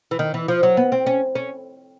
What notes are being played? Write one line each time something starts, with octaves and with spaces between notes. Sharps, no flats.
E3
D#3
E3
F3
F#3
B3
C4
C#4
C#4